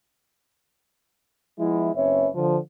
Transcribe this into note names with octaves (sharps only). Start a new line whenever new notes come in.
F3 G#3 B3 E4
F#1 C4 C#4 B4 C#5 E5
D3 F3